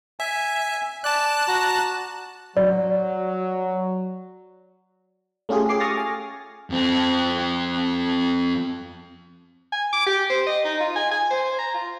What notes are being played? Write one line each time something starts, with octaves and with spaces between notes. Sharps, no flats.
E5 G#5
D5 A5 F#6
F#4 A#5
F#3 D5
A3 C#4 F4 G4 G#4
G#4 D6 C7
C#6 D#6 F6 A6 A#6
G#5
F2 C4
G#5
D6
G4
C5
D#5
D#4
F4
G#5
G#5
C5
A#5
F4